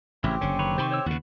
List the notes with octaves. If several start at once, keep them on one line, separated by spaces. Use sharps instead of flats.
A1 C#3 C4 C#4 E4 G4
F#1 D3 C#4
D#3 B4 C#5
C3 D#3 C5 B5 C#6
C5 C#5 E6
D#2 C#3 B3 F#4